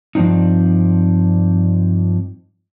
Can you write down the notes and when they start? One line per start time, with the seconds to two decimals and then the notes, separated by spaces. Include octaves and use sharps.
0.15 G2 F3 C4 D4 D#4